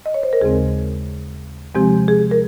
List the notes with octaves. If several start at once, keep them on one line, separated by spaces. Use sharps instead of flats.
D#5
C#5
C5
A#4
D#2 C#3 G#3 C4 G#4
C3 F3 G#3 C4 G4
G#4
A#4